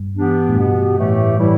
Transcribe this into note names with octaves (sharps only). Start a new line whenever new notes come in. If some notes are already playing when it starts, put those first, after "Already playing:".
Already playing: G2
E3 B3 D4 G4
A2
G2 B2 B3 G4
A2 E3 A3 G4
A2 E3 G3 E4